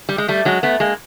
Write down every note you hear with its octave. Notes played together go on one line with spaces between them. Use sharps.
G3
G#3
G3 A3
F#3 G#3
A3 B3
G#3 A#3